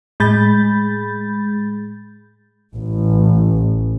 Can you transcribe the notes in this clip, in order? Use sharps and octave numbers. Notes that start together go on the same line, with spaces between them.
A2 G#3 G#4 B5 G6 A6
A1